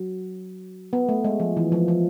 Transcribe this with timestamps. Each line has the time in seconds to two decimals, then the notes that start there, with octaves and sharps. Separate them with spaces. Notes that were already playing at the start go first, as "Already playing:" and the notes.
Already playing: F#3
0.93 B3
1.09 A3
1.24 G#3
1.40 F3
1.57 E3
1.72 F3
1.88 F3